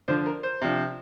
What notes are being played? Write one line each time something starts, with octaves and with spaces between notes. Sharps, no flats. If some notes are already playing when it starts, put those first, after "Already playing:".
D3 F3 D4 C5
A#4
C5
C3 F3 D4